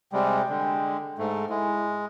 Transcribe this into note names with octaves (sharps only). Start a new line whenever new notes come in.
C3 G3 G#3 G5
D3 G#3
G#2 A3
G#3 E4